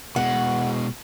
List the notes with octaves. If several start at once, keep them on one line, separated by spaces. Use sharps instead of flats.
B2 G#3 F#5